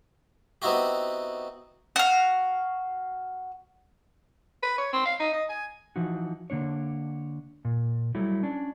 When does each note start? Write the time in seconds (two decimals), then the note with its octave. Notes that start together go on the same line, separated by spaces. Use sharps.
0.62 B3 C4 D#4 E4 F#4 G4
1.96 F#4 F5
4.63 B4
4.78 C#5
4.93 C4
5.05 F5
5.20 D#4
5.33 D#5
5.49 G#5
5.96 E3 F3 D#4 F#4
6.50 D3 A#3 D4 C#5
7.65 A#2
8.15 F#3 G3 A3 E4
8.43 C#4 D4